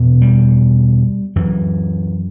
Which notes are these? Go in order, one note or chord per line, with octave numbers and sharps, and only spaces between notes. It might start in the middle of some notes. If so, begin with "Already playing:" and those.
Already playing: E2 B2
G3
F#2 E3